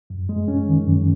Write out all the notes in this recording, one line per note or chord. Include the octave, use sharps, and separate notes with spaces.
F#2
G#3
C#4
D#3
F#2